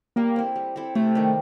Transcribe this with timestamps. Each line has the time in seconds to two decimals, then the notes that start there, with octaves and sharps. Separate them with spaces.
0.16 G3 A#3
0.36 C4 E4 A4
0.56 G3
0.76 C4 E4 A4
0.95 C3 A3
1.15 D#3 G3